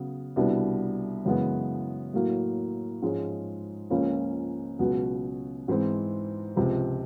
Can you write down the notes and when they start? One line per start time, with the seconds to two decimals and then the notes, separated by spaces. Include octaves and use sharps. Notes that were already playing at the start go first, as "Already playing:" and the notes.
Already playing: C#3 F#3 B3
0.36 C2 B2 G3 B3 D4
1.25 F#2 C#3 E3 G#3 B3
2.14 A2 F#3 A#3
3.02 G#2 F3 G#3 C#4
3.90 C#2 C#3 F3 A#3 C#4
4.79 C#2 B2 F#3 B3
5.68 G#2 E3 G#3 C4
6.56 C#2 C3 F3